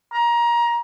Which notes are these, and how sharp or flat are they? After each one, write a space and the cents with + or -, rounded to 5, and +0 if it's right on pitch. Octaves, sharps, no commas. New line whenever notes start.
A#5 +20